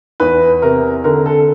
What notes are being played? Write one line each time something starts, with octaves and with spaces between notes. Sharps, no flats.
E2 B4
C3 A#4
D3 A#4
A4